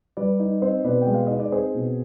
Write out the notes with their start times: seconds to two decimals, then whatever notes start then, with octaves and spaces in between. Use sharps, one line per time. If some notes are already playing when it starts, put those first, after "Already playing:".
0.17 G3 B4 D5
0.40 D#4
0.62 C4 C5 D#5
0.84 B2 B4 D5
1.02 G5
1.07 G#3
1.14 F5
1.27 D#4 D#5
1.40 D5
1.52 C4 G#4 C5
1.75 B2